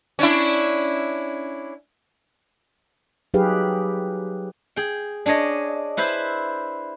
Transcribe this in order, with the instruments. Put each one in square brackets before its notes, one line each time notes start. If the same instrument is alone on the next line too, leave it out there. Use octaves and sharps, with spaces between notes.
[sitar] C#4 D4 E4
[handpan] F#3 D#4 G4 G#4 B4 F5
[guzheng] G#4 G5
D4 G#4 C#5 D#5
E4 B4 C5 E5